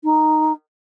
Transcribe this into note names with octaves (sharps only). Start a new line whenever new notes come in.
D#4